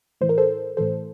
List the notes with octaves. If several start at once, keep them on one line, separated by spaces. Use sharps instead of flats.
A2 E3 C5
A#4
A4 C5
A2 E3 A4 C5